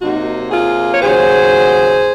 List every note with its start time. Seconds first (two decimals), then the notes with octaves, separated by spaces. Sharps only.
0.01 C3 F#3 A#3 D#4 F#4
0.51 F4 G#4
0.94 C#5
1.01 D#2 C#3 F#3 G#4 C5